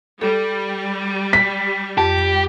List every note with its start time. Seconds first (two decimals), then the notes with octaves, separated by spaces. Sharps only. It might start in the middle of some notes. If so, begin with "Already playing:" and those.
0.22 G3 A4
1.33 B6
1.98 F2 G4